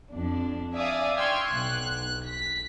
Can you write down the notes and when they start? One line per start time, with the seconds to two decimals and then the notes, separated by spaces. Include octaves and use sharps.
0.11 F2 D4
0.74 D5 E5 F5 G#5 D#6
1.17 G5 C6 C#6 E6 F6 G#6
1.48 B1 F#6
2.26 B6